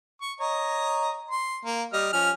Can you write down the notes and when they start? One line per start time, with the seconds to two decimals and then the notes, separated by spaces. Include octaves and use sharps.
0.22 C#6
0.40 C#5 D#5 A#5
1.31 C6
1.66 A#3
1.93 G3 D#5 F6
2.13 F3 C#4 F6